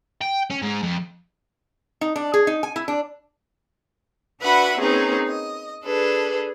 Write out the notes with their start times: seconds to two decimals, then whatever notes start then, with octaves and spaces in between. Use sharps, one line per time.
0.22 G5
0.51 C#4
0.62 G#2
0.83 F2
2.01 D#4
2.16 D4
2.34 G#4
2.47 D#4
2.63 G#5
2.76 E4
2.88 D4
4.41 D4 F#4 B4 E5 F#5 B5
4.79 A#3 C4 C#4 D#4 G#4 B4
5.26 D#5
5.84 D4 G#4 A4 B4